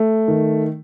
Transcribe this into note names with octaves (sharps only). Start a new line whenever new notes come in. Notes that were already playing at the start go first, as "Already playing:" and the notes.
Already playing: A3
D#3